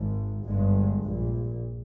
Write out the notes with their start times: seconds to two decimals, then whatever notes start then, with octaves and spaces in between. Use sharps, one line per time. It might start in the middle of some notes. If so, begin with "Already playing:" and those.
Already playing: G#1 G#2
0.46 G1 G2 G#3
1.06 A#1 A#2